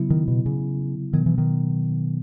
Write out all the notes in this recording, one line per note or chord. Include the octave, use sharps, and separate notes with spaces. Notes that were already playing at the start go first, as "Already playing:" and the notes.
Already playing: C#3 F#3 B3 E4
D#3
B2
C#3
B2 D#3 F#3 B3
E3
D#3